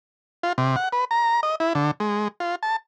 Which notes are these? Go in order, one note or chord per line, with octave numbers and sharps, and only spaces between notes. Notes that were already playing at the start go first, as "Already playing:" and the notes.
F4
C3
F#5
B4
A#5
D#5
E4
D3
G#3
F4
A5